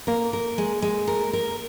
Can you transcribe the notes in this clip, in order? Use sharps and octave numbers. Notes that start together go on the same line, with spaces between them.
A#3 A#4
A#4
G#3
G#3
A#4
A#4